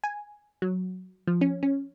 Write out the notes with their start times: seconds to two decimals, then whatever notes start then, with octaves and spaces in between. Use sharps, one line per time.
0.04 G#5
0.62 F#3
1.27 F3
1.41 C#4
1.63 C#4